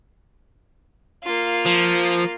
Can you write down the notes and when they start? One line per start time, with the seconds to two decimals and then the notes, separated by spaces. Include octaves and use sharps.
1.23 A#3 F4
1.65 F3